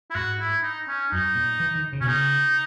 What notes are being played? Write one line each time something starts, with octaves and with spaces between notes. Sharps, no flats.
E4
G#2 F#4
E4
D#4
C#4
F#2 D#4
A#2
E3
D#3
C#3
B2 C#4
C#3 D#4